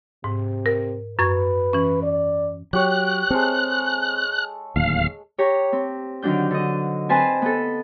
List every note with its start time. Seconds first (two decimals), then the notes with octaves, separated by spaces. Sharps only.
0.24 G#2 C3
0.66 A#4
1.19 F#2 B4 C#6 G#6
1.73 E3 C#4
2.03 D5
2.73 F#3 G4 C#5 F#6
3.30 G#3 C4 A4
4.76 D1 D#2 F5
5.38 G4 C#5 A#5
5.73 C4
6.22 D3 D#3 F#3 D4 G6
6.51 D3 D#5
7.09 C4 B4 C5 G#5 A5
7.42 B3 A4